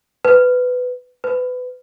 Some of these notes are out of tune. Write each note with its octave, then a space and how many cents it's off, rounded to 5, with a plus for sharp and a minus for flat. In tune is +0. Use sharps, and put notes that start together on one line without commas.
B4 +15
B4 +25